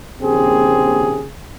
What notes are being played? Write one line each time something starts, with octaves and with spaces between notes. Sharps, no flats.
A#1 D#2 C#3 C4 G4 G#4